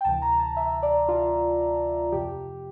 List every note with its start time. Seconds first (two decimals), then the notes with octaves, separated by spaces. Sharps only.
0.01 G5
0.04 D2 C3 E3 A5
0.22 A#5
0.40 A5
0.57 E5
0.83 D5
1.08 F4
2.12 F2 C3 F3 G4